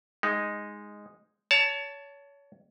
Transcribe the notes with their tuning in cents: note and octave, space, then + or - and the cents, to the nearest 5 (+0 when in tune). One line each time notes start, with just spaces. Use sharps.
G#3 -5 D#4 +0
C#5 +25 A5 +5